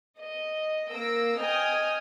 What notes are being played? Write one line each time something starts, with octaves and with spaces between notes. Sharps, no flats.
D#5
A#3 E6 A#6 D7
D#5 G5 G#5 D#6 F6